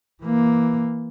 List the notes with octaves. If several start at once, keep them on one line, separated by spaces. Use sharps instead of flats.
E3 A#3